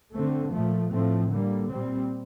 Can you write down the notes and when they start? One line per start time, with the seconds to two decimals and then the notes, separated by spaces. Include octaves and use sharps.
0.14 D3 A3 C4
0.52 A#2 F3 A3
0.90 A2 F3 A3 C4
1.30 D3 G3 A#3
1.68 A#2 G3 C4